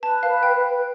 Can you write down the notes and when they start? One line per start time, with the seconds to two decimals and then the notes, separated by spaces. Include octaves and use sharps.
0.02 B4 A5
0.23 F5
0.30 B4
0.43 G5
0.57 B4